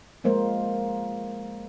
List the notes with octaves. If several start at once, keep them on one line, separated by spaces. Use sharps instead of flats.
F3 G#3 A#3 A#4 C5